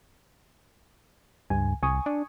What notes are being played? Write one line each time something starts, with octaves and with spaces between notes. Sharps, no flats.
C#2 G2 G#5
C2 G#5 C#6 D#6
D4